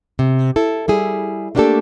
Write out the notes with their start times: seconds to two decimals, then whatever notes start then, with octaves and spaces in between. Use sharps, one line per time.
0.19 C3
0.56 E4 A4
0.88 G3 E4 G#4
1.55 A3 A#3 D4 F4 G4 A4